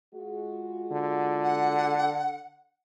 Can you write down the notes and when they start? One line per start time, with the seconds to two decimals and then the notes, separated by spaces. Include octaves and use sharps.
0.15 G#3 F4 F#4
0.91 D3
1.44 F#5